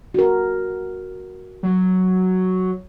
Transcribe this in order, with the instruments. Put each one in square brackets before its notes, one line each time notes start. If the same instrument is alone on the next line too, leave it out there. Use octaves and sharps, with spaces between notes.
[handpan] F#4 A#4
[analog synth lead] F#3